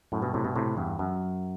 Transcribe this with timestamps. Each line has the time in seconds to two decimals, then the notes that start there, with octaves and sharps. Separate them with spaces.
0.12 F#2 A2
0.22 G2 B2
0.34 A2 C3
0.44 G2 B2
0.55 A2 C3
0.77 E2 G2
0.99 F#2